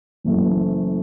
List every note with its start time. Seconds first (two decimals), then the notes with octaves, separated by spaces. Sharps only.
0.24 F#1 F#2 E3 A3